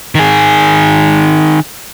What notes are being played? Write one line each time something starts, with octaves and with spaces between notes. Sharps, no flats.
D#3 G#4